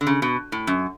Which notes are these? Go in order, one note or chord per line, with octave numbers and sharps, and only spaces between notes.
D3
C#3
B2
A2
F#2